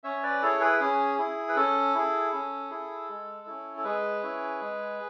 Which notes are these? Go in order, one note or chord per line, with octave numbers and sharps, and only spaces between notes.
C#4 C#5 E5
B4 D5
E4 G#4 A4 C#5
G#4 B4
C#4 G#4
E4 G#4
B4
C#4 A4
E4 G#4
C#4
E4 G#4
G#3
C#4 E4
A4
G#3 G#4 B4
C#4 E4
G#3